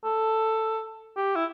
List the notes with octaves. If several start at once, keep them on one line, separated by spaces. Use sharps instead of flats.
A4
G4
E4